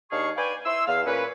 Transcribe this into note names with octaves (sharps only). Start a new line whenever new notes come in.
D#2 D#3 D4 G#4 F5 C#6
B4 D5 F5 G5 G#5
E4 C6 E6
E2 F5
A#2 C#4 B4